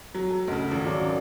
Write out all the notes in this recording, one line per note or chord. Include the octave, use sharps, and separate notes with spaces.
F#3
A4
D2 C#3 D#5
G#1 F3
F#2 D5 A#5